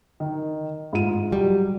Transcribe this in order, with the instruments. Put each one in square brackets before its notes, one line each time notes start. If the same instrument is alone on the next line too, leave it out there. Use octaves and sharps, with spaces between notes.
[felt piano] D#3
G#2 F4 D#7
[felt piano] F#3 [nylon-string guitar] G3